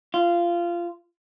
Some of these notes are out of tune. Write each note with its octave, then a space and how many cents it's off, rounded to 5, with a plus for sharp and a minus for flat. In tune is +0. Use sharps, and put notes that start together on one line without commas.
F4 -15